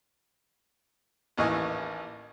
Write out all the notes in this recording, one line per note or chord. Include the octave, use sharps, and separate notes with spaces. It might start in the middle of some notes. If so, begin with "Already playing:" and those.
A1 D#2 E3 D#5 G#5